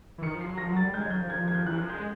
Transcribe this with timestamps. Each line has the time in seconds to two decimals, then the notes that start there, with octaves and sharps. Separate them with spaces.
0.18 E3
0.22 D#3 C#7
0.35 F3
0.41 C7
0.46 F#3
0.58 F3 A#6
0.70 F#3
0.77 A6
0.82 G3
0.94 G#3 G6
1.01 G#6
1.06 F#3 G6
1.18 F3
1.30 F3 G#6
1.48 G#6
1.54 G6
1.66 E3 F#6
1.77 F3 F#6
1.90 G#3 G6